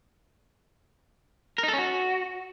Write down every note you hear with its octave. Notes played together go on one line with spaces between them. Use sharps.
A#4
D#4
A4
C#4
F#4